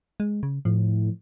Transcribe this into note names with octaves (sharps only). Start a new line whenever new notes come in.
G#3
C#3
A2 F3